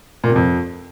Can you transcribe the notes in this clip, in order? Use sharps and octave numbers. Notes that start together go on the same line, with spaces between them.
A#2
C3
F2